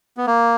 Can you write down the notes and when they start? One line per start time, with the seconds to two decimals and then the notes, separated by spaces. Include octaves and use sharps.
0.17 B3
0.27 A#3